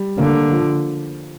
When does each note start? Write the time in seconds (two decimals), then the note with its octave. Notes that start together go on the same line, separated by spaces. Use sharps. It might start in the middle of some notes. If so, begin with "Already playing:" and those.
Already playing: G3
0.18 D3 A#3
0.50 F3